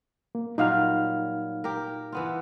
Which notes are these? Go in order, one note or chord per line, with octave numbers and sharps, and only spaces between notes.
A#3
A#2 F#3 G3 D#4 F5 F6
G4 A#4
E3 B3 F4